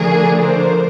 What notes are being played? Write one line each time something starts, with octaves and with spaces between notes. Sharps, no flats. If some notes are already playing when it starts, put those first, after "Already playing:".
Already playing: D3 F3 A3 D4 G#4 A#4
A#4 C5